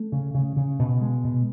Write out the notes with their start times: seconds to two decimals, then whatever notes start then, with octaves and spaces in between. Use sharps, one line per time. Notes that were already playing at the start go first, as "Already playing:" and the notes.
Already playing: A3
0.12 C#3
0.35 C#3
0.57 C#3
0.79 B2
1.01 G#3
1.24 B2